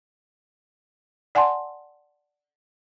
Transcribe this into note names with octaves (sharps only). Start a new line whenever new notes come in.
D5 F#5 G#5 A5 C6